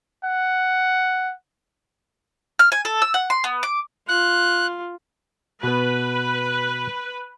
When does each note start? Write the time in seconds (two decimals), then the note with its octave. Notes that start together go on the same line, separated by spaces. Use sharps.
0.24 F#5
2.59 F6
2.72 G#5
2.85 A4
3.02 E6
3.14 F#5
3.30 C6
3.44 B3
3.63 D6
4.09 F4 F#6
5.63 B2 B3 B4